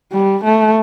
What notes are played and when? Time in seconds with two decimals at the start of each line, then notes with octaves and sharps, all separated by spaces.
0.12 G3
0.44 A3